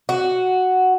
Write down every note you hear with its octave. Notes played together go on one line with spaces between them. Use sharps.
F#4